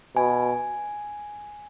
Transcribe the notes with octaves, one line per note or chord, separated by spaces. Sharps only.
B2 G#5